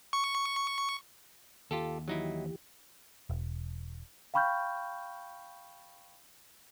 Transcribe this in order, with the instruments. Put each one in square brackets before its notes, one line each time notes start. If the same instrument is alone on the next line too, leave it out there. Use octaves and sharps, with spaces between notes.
[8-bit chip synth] C#6
[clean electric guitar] D#2 [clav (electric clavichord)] F4 G4 A4
[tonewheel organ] E3 G4 [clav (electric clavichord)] F#3 D#4 E4
[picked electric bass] E1
[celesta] F5 G5 B5 C#6 F6 G6